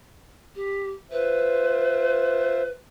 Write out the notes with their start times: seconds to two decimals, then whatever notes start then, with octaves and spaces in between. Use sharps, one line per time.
0.55 G4
1.11 F4 B4 C5 E5